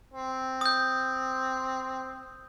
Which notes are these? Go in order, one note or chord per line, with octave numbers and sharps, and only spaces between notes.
C4
D#6 G6